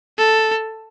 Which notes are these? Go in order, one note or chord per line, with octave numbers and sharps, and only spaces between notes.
A4